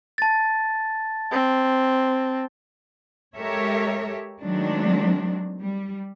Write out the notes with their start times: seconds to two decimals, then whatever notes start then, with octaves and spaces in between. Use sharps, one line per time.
0.18 A5 A6
1.32 C4
3.35 G#3 G4 A4 A#4 C#5 E5
4.42 D#3 F#3 G#3 A3 C4 D4
5.60 G3